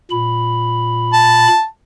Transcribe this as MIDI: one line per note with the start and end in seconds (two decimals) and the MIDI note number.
0.11 1.47 46
0.11 1.47 83
1.13 1.64 81